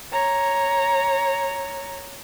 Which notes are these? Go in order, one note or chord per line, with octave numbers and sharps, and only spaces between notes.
C#5 A#5